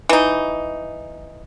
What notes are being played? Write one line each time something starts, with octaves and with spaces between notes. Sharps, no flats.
E3 D#4